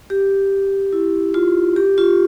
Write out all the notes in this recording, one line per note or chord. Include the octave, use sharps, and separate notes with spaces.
G4
E4
F4
G4
F4